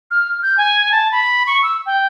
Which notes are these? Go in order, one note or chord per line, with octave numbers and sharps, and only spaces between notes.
F6
G6
G#5
A5
B5
C#6
E6
G5